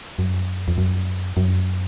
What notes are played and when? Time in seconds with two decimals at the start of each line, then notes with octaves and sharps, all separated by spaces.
0.19 F#2
0.68 F2
0.78 F#2
1.37 F#2